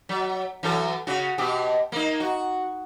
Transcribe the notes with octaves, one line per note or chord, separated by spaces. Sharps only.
F#3
E3 F#3 A4
C#3 F#4
B2 G4
A#3 D#4
F#4